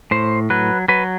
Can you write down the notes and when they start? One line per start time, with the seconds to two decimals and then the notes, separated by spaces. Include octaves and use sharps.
0.11 A2 C5
0.50 F#3 B4
0.88 F#3 B4